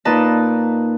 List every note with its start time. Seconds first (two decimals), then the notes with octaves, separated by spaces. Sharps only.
0.05 A#2 D#4 B4 A5